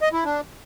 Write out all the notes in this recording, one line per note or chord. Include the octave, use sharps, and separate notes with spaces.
D#5
E4
D4